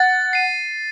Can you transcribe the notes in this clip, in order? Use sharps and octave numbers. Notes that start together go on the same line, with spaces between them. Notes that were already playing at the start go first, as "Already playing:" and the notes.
Already playing: F#5 A6
C7 D#7